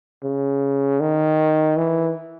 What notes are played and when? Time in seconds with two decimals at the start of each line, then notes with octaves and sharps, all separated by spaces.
0.24 C#3
1.00 D#3
1.77 E3